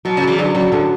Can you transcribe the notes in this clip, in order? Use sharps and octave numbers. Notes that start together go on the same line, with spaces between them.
B2 F#3
C#3
F#3
C#3 E3
D3 F#3
C#3 F#3
A2 D3